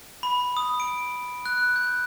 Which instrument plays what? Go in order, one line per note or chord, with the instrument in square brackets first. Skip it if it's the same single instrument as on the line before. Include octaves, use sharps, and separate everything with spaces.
[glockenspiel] B5
D#6
D7
F#6
G6